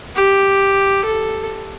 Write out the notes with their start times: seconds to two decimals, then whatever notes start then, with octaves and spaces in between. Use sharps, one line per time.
0.16 G4
1.04 A4